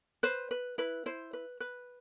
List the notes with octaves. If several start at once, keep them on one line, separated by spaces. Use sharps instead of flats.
B4 C5
B4
E4 B4
E4 C5
B4
B4